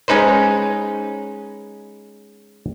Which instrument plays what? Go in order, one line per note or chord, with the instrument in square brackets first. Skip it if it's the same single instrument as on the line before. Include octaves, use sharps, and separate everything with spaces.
[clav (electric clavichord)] G#3 C#4 D#4 B4 C5